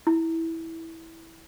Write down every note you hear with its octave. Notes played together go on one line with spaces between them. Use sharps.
E4